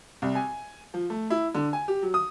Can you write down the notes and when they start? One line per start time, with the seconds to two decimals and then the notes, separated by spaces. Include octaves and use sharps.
0.22 C2
0.35 G#5
0.94 F3
1.10 A3
1.30 E4
1.55 D3
1.73 G#5
1.88 G4
2.02 F#3
2.14 D#6